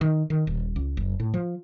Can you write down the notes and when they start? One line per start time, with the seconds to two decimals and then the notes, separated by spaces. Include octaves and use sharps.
0.01 D#3
0.30 D#3
0.47 D#1
0.76 C#2
0.97 F#1
1.20 A2
1.34 F3